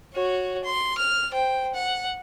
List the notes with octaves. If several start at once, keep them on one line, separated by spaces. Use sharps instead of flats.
F#4 C#5
C6
F6
C5 G5
F#5